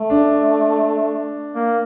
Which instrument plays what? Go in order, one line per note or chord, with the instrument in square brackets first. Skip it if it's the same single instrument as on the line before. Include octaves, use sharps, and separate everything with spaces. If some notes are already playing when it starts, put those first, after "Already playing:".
Already playing: [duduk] A3
[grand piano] D4
[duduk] A#3